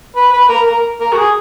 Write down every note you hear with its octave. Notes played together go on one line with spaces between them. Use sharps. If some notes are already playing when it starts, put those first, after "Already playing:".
B4
B4
A#4
A#4
A#4
F#4
G#4